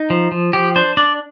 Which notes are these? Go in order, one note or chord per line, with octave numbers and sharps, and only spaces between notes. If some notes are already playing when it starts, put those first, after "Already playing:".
Already playing: D#4
F3
F3
F3 G4
D4 C5
D4 D5